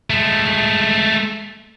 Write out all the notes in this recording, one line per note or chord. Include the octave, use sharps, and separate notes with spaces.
G#3 A3